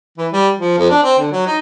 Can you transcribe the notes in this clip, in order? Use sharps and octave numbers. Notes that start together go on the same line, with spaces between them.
E3
G3
F3
F2
D4
C4
D3
F#3
D#4